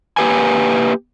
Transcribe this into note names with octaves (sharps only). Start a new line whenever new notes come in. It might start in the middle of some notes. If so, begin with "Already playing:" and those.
A#3 G4 B4 G#5